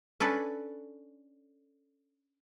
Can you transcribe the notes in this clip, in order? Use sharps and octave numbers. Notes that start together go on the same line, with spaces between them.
C#4 D4 A4 B4